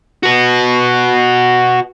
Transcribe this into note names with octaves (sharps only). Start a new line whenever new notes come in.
F#4 B4